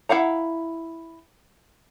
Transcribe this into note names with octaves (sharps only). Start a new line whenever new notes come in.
E4 F5 F#5 A#5